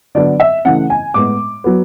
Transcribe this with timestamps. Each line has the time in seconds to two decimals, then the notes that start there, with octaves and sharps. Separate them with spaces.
0.15 D3 F#3 B3 D5
0.40 E5
0.65 C#3 E3 A3 F#5
0.90 G#5
1.14 A2 G#3 B3 D6
1.64 F#3 B3